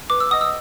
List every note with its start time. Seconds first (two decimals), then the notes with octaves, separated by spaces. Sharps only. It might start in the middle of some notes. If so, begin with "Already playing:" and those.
0.10 B4 D6
0.20 E6
0.31 D#5 F#5 D#6
0.41 E6